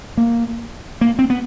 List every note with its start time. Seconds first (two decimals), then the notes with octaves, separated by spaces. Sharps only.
0.17 A#3
1.01 A#3
1.19 C4
1.30 B3